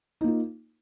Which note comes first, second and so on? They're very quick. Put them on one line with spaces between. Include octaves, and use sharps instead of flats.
D#4 A#3 F4